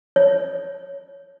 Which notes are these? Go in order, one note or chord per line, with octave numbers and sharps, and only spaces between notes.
C#5